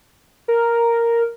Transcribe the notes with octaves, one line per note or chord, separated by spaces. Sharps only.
A#4